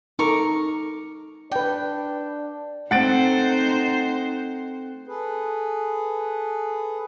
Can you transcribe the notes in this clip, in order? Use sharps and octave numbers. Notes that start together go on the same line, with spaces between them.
D#4 A4 A#4 C#6 D6
D4 B4 D5 G5
A3 C4 D#4 C5 F#5 A6 D7
G#4 A4 B4